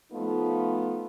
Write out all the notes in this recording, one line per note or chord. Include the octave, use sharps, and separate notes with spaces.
F3 A3 B3 D#4 F4